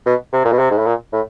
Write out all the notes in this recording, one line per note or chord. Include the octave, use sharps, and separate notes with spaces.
B2
C3
A#2
B2
C3
G#2
A2
A#2
A2